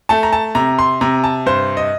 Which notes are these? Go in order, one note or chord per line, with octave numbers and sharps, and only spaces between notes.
A3 A5
A#5
A5
C3 A#5
C6
C3 A#5
A5
G2 C5
D#5